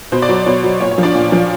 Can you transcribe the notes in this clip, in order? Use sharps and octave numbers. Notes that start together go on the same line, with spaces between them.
B2 C5
D5
F#3 C#5
B2 C#5
F#3
A#2 C#5
C#5
F3
D4 D5
A#2
F3